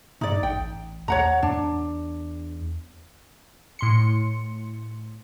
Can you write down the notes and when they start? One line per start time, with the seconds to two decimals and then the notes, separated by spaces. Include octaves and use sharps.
0.21 G2 D#4 D5
0.43 A1 G5
1.08 D#2 C#5 F#5 A#5
1.43 E2 D4
3.79 A2 C6 C#7